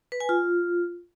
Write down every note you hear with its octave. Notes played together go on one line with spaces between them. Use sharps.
B4
G#5
F4